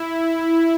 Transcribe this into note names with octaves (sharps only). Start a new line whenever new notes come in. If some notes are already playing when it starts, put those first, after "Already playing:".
Already playing: E4